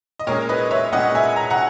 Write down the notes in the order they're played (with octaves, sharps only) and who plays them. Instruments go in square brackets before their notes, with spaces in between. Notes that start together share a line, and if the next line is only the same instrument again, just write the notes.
[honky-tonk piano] D#5
A#2 G#3 C#4 A#4 C#5
B4 D#5
C#5 E5
A#2 G#3 C#4 D#5 F#5
E5 G#5
A#5
F#5 A#5